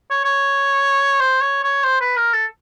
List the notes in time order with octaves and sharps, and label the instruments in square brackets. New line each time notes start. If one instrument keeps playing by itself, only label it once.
[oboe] C#5
C#5
C5
C#5
C#5
C5
B4
A#4
A4